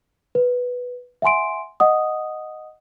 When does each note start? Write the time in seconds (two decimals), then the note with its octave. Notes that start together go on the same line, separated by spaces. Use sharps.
0.35 B4
1.22 E5 F#5 G#5 C6 D7
1.80 D#5 F#5 D#6